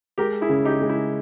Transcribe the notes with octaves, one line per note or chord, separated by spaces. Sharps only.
G#3 G4 A#4
E4 G#4
C#3
D#4 G4
G#3
E4